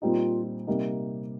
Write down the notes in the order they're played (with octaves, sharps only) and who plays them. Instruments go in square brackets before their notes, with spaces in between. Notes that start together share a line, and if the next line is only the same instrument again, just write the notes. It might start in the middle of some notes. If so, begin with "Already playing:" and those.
[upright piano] A#2 G3 C4 D#4 [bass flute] F4
[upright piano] C3 G3 A#3 D#4